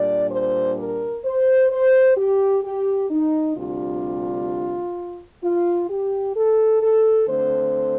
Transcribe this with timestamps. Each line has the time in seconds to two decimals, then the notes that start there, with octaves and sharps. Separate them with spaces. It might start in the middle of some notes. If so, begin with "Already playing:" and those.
Already playing: A#2 G3 D4 D5
0.31 C5
0.78 A#4
1.24 C5
1.70 C5
2.17 G4
2.63 G4
3.10 D#4
3.56 D2 C3 G3 D4 F4
5.42 F4
5.89 G4
6.35 A4
6.82 A4
7.28 D3 A3 C4 C5